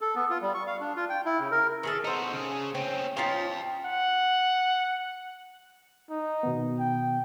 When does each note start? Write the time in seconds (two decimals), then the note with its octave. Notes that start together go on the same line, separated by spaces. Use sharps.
0.01 A4
0.16 B3
0.30 F4
0.42 G3
0.54 C#6
0.67 F5
0.80 D4
0.96 F4
1.09 G5
1.25 E4
1.40 C#3
1.51 A#4
1.83 D#3 G#4 A4
2.04 D#4 F#4 A4 C5
2.33 C#3 G#4
2.75 C4 C#4 G5
3.17 C#4 D#4 F4 F5 G5
3.85 F#5
6.10 D#4
6.43 B2 D#3 B3
6.80 G5